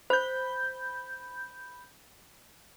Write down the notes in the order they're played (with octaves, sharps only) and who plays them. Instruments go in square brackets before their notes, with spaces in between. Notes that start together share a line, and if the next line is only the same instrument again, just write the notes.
[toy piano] C5 [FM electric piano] B5 G6